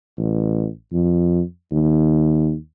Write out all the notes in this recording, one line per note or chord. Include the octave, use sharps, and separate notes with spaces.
A1
F2
D#2